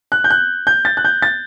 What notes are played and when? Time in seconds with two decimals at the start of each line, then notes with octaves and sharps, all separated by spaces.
0.12 F#6
0.24 G6
0.30 F#6
0.67 G6
0.85 A6
0.97 F#6
1.05 G6
1.22 A6